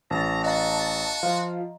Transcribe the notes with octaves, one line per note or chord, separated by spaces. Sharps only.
A1 A5 A#5
F#4 D#5 F5 A#5
F3 F4